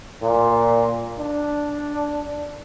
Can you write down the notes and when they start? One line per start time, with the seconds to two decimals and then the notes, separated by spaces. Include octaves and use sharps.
0.22 A#2
1.19 D4